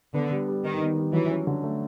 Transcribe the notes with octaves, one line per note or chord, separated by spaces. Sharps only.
D3 B3
G3
G3
D#3 D#4
B3
G3
E3 F#3
C#4
D3
A3